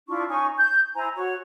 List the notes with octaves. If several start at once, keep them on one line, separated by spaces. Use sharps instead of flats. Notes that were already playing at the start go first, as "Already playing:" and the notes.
D4 E4 F4 C#6
C#4 D#4 G#5 C#6
G6
E4 C5 G#5 A#5
F#4 C#5